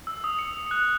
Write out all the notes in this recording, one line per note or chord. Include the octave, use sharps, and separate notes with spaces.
E6
D#6
C#7
F#6